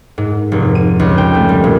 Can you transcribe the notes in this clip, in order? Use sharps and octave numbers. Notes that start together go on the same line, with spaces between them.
G#2
F1
D#7
C#2
G5
A3
G3
A#2